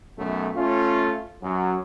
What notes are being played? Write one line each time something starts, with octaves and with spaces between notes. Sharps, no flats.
B1 F#2 F#3 A3
A3 C#4 F4
F#2 F#3